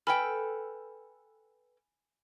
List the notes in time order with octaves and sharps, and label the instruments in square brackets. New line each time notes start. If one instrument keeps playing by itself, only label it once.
[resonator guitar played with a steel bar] A4 B4 G5 [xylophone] G#5 B5 F6